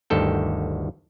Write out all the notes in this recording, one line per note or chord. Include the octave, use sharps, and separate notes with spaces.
G1 D2 D#3 A4 G5